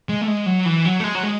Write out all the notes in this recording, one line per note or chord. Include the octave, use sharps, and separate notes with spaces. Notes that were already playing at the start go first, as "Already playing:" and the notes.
G#3
A3
G#3
F#3
E3
F#3
A3
G#3
F#3
G#3